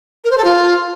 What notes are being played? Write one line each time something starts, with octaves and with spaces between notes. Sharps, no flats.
A#4
C5
A4
F4